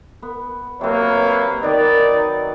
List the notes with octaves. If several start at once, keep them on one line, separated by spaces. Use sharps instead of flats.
B3
C3 F#3 A#3 B4 C#5
B5
D#3 B3 D#4 D5